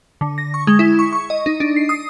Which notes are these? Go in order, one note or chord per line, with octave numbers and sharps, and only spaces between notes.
D3
A#6
C#6
G#3
E4
C#6
C#6
D#5
D#4
D4
C7
D#6